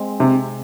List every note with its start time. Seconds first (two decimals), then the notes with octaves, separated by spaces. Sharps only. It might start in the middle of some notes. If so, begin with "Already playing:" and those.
Already playing: G#3 C4
0.20 C3